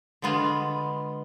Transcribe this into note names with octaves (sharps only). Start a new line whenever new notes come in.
D3 G#3 B3 F4